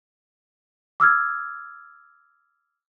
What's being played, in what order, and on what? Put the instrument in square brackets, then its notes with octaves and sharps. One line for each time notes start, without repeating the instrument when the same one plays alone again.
[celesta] D6 E6 F6 G#6